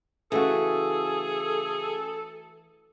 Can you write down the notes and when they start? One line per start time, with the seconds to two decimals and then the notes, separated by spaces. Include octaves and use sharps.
0.32 C#3 E3 A3 F#4 G#4 A4